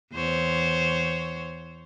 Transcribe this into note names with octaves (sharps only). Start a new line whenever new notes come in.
E2 C5 C#5